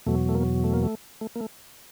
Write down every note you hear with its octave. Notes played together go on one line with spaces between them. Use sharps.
E2 B2 F#3 A3
A3
A#3
A3
A#3
A3
A3
A#3
A3